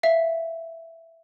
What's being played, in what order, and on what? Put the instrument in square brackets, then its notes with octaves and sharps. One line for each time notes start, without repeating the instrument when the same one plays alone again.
[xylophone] E5 F5